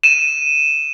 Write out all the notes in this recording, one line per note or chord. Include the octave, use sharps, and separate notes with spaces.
D#7 E7